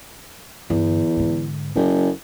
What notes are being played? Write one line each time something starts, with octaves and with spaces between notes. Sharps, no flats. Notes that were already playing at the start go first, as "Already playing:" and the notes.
E2 G2 D3
G#2 D3
F#1 C#4